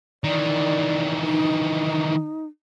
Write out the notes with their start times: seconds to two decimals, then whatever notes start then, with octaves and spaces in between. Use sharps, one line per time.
0.24 D#3 E3 D5
1.25 D#4